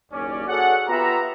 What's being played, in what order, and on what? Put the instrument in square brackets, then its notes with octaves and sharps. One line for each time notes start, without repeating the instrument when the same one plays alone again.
[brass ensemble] F#1 D#2 C#4 D5
F#4 G#4 A4 C#5 D5 F#5
B3 F4 G4 B4 E5 A#5